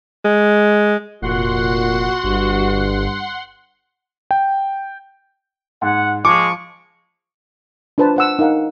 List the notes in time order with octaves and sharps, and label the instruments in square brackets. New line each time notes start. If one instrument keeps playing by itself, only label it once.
[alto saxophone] G#3
[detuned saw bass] F1 [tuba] A#2 [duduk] F#4 [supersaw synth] F#5 C6
[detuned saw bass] G1 [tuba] G2
[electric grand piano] G5
[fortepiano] G#2 [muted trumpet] F#5
[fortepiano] F3 [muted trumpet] G#3 [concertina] C#6 [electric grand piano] D6
[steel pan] D4 F4 B4 C5 A5
C5 F#5 E6
D#4 A#4 F5 F#5 G#5